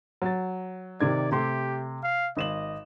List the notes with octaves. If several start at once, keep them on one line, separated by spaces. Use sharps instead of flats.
F#3 A6
C3 D#3 D5 G#6
C3 A3 G4 C6
F5
G#1 D#5 E7 F#7